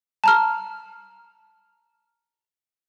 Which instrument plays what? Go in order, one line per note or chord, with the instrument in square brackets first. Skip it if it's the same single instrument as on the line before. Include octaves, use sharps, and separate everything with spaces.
[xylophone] A5 A#5 F6